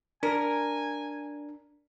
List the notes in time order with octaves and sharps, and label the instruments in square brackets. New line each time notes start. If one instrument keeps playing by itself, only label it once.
[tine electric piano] D4 [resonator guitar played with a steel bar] A#4 [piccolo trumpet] G#5